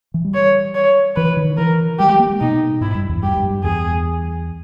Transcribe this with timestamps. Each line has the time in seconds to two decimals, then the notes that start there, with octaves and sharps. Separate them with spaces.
0.14 E3
0.24 G3
0.34 C#5
0.75 C#5
1.16 E3 B4
1.37 D#3
1.58 E3 A#4
1.99 G3 G4
2.09 G#3
2.19 A#3
2.30 G#3
2.40 B2 D#4
2.81 G#2 E4
2.95 G2
3.09 E2
3.23 G2 G4
3.37 G2
3.50 G2
3.64 E2 G#4